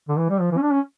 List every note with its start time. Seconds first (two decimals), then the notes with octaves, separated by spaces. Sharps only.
0.09 D3
0.18 E3
0.30 G3
0.40 F3
0.51 E3
0.57 C#4
0.62 D4
0.73 C#4